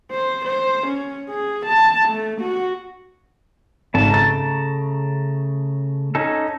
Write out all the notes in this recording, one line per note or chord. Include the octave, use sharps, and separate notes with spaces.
C5
C5
C#4
G#4
A5
A3
F#4
G#1 G#2 C#3 A3 A5
A#5 A6
C#4 D#4 A4